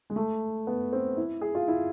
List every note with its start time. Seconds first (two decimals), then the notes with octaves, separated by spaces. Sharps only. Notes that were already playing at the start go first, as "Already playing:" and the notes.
0.10 G#3
0.16 A3
0.67 B3
0.93 C4
1.17 E4
1.41 G#4
1.55 F4
1.68 E4